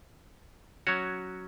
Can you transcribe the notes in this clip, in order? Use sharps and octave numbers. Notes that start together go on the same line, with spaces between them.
F#3 C#4 F#4 C#5